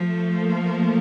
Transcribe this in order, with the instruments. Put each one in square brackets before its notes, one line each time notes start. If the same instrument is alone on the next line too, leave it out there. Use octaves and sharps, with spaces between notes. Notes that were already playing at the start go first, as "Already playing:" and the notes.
Already playing: [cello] F3 [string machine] A3 A4
[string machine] A#3 A#4